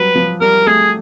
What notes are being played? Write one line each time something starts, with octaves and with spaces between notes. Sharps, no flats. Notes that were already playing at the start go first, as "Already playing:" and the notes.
Already playing: F#3 G3 B4
F3
G3 A#4
A3 G#4